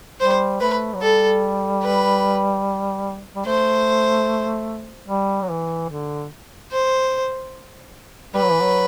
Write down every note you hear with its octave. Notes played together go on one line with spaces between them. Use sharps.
G3 C5
A3 B4
F#3
G3 A4
B4
G3
A3 C5
G3
F#3
E3
D3
C5
G3 B4
F#3
E3
F#3